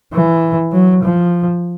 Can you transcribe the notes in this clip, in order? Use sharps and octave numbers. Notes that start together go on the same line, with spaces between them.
E3
F#3
F3